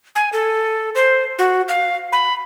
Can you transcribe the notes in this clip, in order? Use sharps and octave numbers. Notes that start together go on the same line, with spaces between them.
G#5
A4
C5
F#4
F5
B5